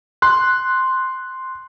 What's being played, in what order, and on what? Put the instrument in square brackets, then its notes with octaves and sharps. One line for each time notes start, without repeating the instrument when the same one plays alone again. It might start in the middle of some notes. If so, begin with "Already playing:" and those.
[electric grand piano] C6 F#6